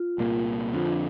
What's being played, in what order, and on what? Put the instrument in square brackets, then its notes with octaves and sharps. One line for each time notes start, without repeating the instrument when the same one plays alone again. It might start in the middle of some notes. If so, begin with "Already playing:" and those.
Already playing: [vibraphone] F4
[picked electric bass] C2 A#2 A#3
[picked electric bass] F2 D3 F3 [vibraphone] F4
[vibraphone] D4